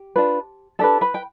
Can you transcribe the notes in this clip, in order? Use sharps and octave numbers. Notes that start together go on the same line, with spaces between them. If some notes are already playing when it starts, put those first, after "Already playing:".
Already playing: G4
D4 F4 B4
D4 G4 A4 B4 A5
B4 B5
G5